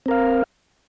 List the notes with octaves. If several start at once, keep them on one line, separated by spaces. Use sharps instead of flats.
C4 A#4 F5